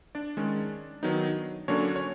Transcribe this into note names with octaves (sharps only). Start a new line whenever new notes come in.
D4 D5
D#3 G#3 C#4
D#3 F#3 B3 D#4
D3 F#3 A#3 C#4 D4 C#5
C#5